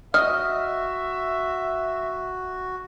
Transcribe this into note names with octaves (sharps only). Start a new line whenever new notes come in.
F#4 D#5 E5 F6